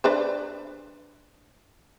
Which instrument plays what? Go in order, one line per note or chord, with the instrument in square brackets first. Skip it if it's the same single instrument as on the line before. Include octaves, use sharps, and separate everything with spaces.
[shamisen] D4 B4 C5